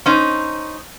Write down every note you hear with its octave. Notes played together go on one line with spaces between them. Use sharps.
C#4 D#4 C5